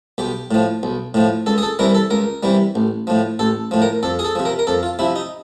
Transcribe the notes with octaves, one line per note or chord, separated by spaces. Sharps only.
B1 G4
A2 F3
B1
A2 F3
C#2 A4
G#4
A4
C3 E3 G3 A#4
A4
C#2 A#4
C3 E3 G3
A1
A2 F3
A1 A4
A2 F3
A#4
F2 A4
G#4
A4
C3 F3
A#4
A#4
F2 A4
F4
C3 F3 E4
D#4